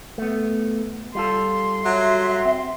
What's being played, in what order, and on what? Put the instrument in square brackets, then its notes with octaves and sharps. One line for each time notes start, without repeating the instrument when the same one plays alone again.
[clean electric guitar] A3 B3
[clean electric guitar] G3 F4 A4 [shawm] C6
[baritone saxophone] F#3 [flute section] E5
[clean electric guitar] C4